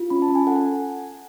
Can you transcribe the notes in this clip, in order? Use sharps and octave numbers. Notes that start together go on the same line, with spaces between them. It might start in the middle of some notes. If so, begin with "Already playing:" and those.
Already playing: F4
C#4 B5
A5
C#4
G#5
A4 F#5
G#5